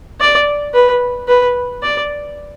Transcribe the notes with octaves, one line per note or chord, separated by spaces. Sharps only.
D5
B4
B4
D5